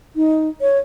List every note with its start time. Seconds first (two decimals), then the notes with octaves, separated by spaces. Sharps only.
0.16 D#4
0.61 C#5